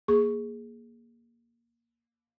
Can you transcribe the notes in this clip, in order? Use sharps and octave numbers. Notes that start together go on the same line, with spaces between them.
A#3 G#4 C#6